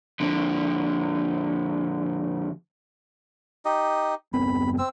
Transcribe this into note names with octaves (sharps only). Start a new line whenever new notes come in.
F2 D3
D#4 G4 D#5
F#1 B3 C4 B5
C4 E6